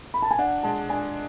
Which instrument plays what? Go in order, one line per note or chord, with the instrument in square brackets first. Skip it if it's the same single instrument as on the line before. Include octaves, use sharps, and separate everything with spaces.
[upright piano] B5
A5
G#5
[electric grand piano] D4 [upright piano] F#5
[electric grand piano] G#3 [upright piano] A5
[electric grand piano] D4 [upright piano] G#5